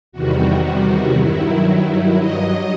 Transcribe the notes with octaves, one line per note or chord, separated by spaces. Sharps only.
E2 C3 D#3 G3 F#4
G2 D#3 F#3 E4
E4
G2 F#3 D#5